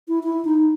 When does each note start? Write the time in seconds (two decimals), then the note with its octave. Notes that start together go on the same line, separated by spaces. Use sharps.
0.08 E4
0.23 E4
0.45 D#4